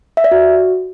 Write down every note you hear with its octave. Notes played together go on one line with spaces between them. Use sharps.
E5
D5
F#4